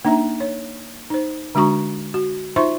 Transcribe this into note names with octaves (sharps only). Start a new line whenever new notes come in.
A#3 D4 D#4 E5 A#5
C#5
D#4 C5
D3 G#3 D4 F#4 A#5 C#6
F#4
D#4 F4 C5 E5 C6 C#6